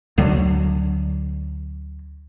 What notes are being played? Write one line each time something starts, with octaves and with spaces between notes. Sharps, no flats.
D2 D3 F#3